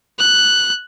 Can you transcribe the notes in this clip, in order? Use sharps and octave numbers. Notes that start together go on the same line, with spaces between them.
F#6